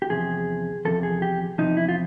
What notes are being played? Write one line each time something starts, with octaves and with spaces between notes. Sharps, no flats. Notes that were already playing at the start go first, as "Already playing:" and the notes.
G4
E2 C3 F3 G#4
E2 C3 F3 A4
G#4
G4
E2 C3 F3 D#4
E4
F4